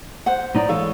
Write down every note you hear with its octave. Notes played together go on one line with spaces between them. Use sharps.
C5 F#5
A2 D#4 D5
E3 G#3 A4 C#5 F5